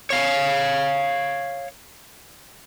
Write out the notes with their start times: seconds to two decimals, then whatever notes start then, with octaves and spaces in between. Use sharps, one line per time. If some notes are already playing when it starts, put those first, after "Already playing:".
0.10 C#5 F5